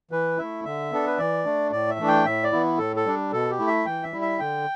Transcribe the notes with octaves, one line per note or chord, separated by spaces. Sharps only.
E3 B4
A3 E4 E5
D3 E5
B3 D4 A4
B4
E3 D5
A3 D4
A2 D5
E5
E3 A3 D4
G5
A2 E5
D5
E3 B3 E4
A2 A4
A4
G3 D4
B2 A4
G4
A3 E4
E5
E3 G5
E5
G3 E4
E5
D3 G5